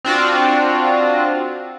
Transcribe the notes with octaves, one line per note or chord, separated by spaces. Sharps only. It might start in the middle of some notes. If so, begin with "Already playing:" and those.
C4 D4 F4 F#4